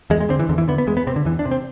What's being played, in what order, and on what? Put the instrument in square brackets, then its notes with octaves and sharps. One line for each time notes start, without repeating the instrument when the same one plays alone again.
[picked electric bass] E2 G#3
G#3
D3 C4
E3
E2 D3
E3
D3 B3
B3
E2 G#3
B3
C3 C4
D3
E2 E3
D4
C3
C4